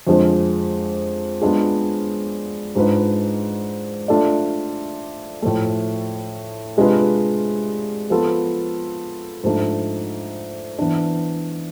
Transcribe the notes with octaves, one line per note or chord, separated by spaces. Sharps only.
F2 D3 F3 G#3 C4
G#3 B3 D4 F4 G#4
G#2 G#3 D4 F4 B4
A3 D4 F4 A4 D5
A2 F3 A3
C3 G#3 D4 F4 B4
F3 B3 F4 A4
G#2 F3 A3 D4
E3 B3 D4